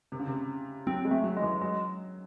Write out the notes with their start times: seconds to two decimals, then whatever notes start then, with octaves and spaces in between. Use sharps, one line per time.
0.12 C3
0.19 C#3
0.27 C3
0.86 F#3 C4
1.05 G#3
1.11 A3
1.24 F#3
1.37 G#3
1.42 E3
1.61 F#3 G#3